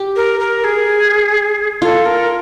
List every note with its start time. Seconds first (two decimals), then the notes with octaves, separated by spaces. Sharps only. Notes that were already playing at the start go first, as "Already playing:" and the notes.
Already playing: G4
0.16 A#4
0.40 A#4
0.64 G#4
1.82 F4 A4
2.06 A#4